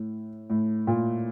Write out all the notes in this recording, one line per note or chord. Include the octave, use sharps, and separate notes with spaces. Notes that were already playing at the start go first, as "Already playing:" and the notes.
Already playing: A2
A2
A#2